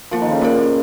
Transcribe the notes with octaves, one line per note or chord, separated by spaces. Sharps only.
F3 A#3 F4 A#4
D#3
C#3
A#2 A#3 F4 A#4